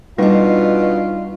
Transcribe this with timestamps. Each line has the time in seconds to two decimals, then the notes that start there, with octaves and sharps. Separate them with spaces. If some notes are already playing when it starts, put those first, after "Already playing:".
0.18 B2 G3 D4 D#4 F4